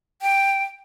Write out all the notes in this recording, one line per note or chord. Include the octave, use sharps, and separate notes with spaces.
G5